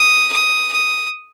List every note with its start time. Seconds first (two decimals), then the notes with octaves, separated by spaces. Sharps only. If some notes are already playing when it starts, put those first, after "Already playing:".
Already playing: D#6
0.32 D#6
0.73 D#6